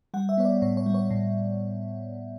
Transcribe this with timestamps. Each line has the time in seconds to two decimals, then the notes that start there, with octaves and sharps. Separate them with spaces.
0.14 G3 F#5
0.29 E5
0.37 B3 C#5
0.45 D5
0.62 A2 C#5
0.77 C#5
0.86 G3
0.94 C#5
1.11 A2